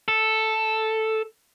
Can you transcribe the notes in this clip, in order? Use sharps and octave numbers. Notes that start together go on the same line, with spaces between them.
A4